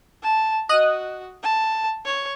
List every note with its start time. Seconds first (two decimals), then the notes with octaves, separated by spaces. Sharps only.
0.23 A5
0.69 F#4 D#5 D#6 F#6
1.43 A5
2.05 C#5